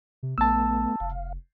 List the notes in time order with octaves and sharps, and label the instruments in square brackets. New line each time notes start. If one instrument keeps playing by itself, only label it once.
[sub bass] C3
[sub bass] A#1 [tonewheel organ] A3 B3 [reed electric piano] A5 E6
[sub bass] F1 [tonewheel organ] F5